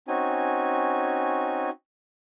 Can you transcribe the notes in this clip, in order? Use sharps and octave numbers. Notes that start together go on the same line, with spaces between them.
C4 C#4 D#4 F#4 G#5